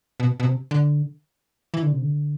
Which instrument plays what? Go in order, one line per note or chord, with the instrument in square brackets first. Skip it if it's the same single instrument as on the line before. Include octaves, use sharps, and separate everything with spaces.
[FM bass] B2
B2
C3
D3
E3
D3
C3
D3